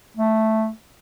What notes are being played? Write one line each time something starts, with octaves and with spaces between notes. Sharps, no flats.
A3